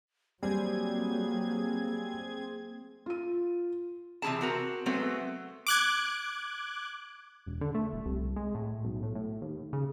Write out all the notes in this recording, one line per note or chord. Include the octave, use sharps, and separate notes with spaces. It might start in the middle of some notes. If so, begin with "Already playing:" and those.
F#3 G3 A#3 C4 G#4 G#6
F4 D#7
C3 E3 E4 G#4 A5
C4 F#4 A#4
F#3 G#3 A3 B3 C4
D6 F#6 G#6
E1
D3
A3
D#1
C2
G#3
A2
B1
A2
A2
D#2
C#3